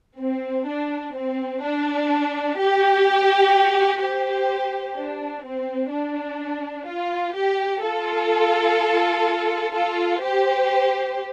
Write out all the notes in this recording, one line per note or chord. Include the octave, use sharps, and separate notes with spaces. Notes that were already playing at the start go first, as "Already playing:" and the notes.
C4
D4
C4
D4
G4
G4 C5
D4
C4
D4
F4
G4
F4 A4
F4 A4
G4 C5